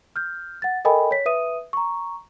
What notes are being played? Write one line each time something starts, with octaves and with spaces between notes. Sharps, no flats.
F6 G6
F#5 A6
A4 A#4 D#5 G5 G#5 B5
C#5 B6
B4 E5 D#6 D#7
A#5 C#6